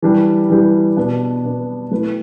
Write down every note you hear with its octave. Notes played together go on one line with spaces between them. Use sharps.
E3 G3 D4 G4
E3 G3 D4 G4
B2 B3 D4
B2 B3 D4
A3 E4 B4